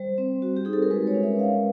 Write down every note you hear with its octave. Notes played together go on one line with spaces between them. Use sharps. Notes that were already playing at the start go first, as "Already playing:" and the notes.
Already playing: G3 C5
C4
F#4
G4
D#4 G#4
A4
A#4
G#3 B4
C#5
C#4
E5
G#3 F5